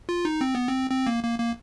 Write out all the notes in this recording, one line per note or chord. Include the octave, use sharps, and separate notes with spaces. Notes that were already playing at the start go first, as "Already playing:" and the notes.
F4
D#4
C4
B3
C4
C4
A#3
A#3
A#3